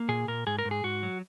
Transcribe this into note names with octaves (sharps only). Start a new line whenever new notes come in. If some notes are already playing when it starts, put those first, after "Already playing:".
Already playing: A#3
A#2 G#4
A#2 A#4
G#2 G#4
A#4
G#2
G#4
G#2 F#4
F#3